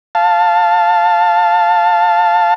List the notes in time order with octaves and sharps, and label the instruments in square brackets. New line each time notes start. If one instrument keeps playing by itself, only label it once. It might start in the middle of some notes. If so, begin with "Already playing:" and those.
[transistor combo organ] F5 A5